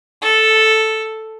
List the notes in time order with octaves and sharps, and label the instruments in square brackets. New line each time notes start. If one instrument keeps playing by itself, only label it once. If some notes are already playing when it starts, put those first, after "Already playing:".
[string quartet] A4